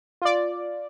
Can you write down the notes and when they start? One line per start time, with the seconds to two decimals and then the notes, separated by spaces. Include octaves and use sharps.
0.22 F4 D5